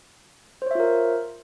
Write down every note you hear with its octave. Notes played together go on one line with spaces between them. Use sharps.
F4 A#4 C5 C#5 E5